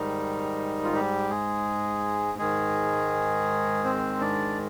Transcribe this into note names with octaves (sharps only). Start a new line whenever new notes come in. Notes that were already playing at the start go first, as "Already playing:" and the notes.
Already playing: G#2 D#3 G3 D#4
F4
G3 G4
G#3 G#4
G#2 D#3 G#3 G#4
C4 C5
D4 D5